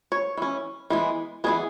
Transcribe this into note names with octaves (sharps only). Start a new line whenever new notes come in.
C#5
E3 C#4
E3 G#3 B3
E3 G#3 B3 G#4